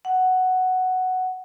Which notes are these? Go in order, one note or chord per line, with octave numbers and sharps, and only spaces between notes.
F#5